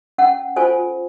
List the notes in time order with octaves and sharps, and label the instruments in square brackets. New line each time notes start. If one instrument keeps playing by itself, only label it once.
[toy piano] C#4 F#5
F4 A4 C5 G#5